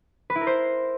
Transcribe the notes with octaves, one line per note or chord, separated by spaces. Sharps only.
B4
E4
A#4
C5